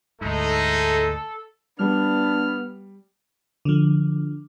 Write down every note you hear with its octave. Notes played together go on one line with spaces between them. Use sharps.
D2 G#2 G#3 A3 D#4 A4
G3 B3 D4 F6
D3 F3